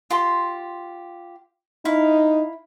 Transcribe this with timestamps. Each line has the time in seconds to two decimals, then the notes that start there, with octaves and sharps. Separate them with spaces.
0.10 F4 G4 C6
1.85 D#4 E4 F5